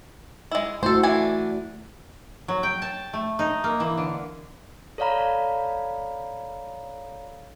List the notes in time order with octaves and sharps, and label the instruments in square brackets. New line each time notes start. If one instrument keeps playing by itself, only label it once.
[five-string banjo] G#3 E4
[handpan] A3 E4 F#4 [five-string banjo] A4 C5
[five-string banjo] E3 D4 G#5
[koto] F#3
G5
A5
A3
D#4
A#3
E3
D3
[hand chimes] A4 C#5 D5 F5 A#5 B5